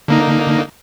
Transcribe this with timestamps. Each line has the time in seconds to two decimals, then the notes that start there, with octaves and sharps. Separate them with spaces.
0.08 D3 A#3 D#4